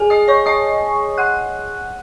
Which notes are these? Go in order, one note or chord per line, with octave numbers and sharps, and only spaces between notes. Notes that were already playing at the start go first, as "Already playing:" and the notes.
Already playing: G#4 G#5
D#5 D#6
C#5 C#6
D#5 D#6
F#5 F#6